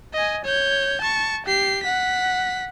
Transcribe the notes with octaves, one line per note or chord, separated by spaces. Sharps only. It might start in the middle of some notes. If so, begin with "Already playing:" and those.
D#5 G#5
C#5 G6
A5 C#6
G4 C7
F#5 B6